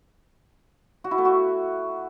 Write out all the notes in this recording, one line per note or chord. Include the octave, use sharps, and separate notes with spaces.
F#4
E4
A3
F#4